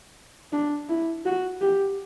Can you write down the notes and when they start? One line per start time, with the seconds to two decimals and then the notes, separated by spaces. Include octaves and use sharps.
0.52 D4
0.89 E4
1.25 F#4
1.61 G4